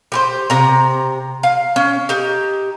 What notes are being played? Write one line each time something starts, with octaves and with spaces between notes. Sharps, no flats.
G4 B4 C5
C3 A#5
F5
C#4
D#4 G4